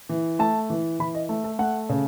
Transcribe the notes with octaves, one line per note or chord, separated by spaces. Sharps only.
E3
A3 A5
E3
E3 B5
D#5
A3
A4
A3 F#5
C#3